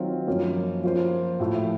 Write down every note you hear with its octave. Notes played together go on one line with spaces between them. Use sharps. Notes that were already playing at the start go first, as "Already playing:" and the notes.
Already playing: D#3 F#3 C4 F4
F#2 F3 A#3 C#4
F3 A#3 F4 C5
A2 F3 A3